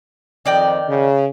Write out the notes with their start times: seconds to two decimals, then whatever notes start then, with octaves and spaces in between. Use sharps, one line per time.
0.46 F2 D#3 D5 D#5 G5
0.89 C#3